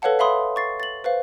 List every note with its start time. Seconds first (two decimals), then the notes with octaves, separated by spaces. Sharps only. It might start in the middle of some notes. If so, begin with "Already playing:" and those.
0.02 A4 B4 C#5 F5 F#5 A5
0.19 E5 F5 B5 C6 D#6
0.56 C#6 A6 C7
0.80 A6 F#7
1.04 B4 C5 F5